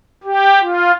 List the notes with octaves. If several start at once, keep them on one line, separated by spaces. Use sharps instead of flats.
G4
F4